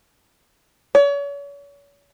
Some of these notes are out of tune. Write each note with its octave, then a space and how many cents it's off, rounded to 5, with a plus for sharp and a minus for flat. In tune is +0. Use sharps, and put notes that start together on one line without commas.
C#5 +40